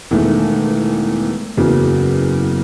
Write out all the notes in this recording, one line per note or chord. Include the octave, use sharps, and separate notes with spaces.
E1 E2 D#3 A3
F#1 E2 C#3 F#3